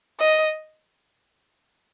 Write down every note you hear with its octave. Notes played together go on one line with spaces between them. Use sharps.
D#5